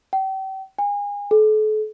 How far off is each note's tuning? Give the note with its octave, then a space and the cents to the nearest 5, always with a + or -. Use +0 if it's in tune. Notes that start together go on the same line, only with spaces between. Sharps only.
G5 -35
G#5 -35
A4 -40